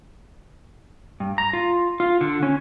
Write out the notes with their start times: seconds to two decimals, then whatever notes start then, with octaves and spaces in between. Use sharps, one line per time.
1.20 G2
1.38 A#5
1.53 F4
2.00 F4
2.21 D3
2.43 C#4